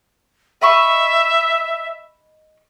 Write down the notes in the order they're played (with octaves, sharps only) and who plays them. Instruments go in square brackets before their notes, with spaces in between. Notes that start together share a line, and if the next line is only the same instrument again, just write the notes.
[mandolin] D#5 B5 C#6 [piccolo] E5